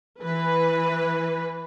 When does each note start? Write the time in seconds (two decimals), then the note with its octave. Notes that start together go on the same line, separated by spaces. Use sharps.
0.23 E3 B4